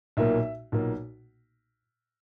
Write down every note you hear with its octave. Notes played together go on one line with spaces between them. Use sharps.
B1 A#2 A#3 E5
B1 A#2 A#3